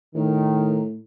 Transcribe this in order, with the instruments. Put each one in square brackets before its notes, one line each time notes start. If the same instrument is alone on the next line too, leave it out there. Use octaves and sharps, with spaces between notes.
[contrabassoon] A2 [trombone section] D#3